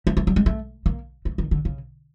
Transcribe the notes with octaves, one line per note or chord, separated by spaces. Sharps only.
A3
A3
G3
G#3
A3
A#3
A3
D#3
D3
C#3